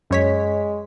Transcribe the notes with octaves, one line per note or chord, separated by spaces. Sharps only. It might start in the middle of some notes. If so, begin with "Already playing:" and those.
F#2 G#3 C#5 B6